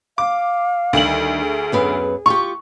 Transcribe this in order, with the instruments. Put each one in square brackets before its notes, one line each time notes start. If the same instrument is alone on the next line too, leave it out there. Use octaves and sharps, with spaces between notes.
[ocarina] F5 [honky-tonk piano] D6
[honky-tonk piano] D2 F#7 [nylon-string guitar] D#3 G3
[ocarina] G#4
[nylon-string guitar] F#2 B3 B4
[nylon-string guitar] F4 G4 [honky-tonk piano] C#6